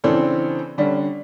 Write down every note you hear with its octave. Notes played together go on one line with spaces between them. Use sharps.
C#3 E3 C4 D4 A4
D3 G3 C#4 D4